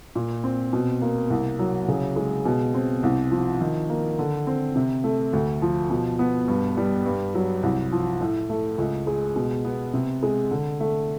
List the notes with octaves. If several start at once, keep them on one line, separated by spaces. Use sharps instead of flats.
A#2
C4
B2
A#3
C2
F#3
C#3
G#3
B2
C4
C2
F3
D#3
A#3
D3
C4
C3
A3
D2
F3
B2
B3
G2
G3
G2
F#3
C2
F3
A2
A3
C#2
G#3
B2
B3
C3
G#3
D3
A3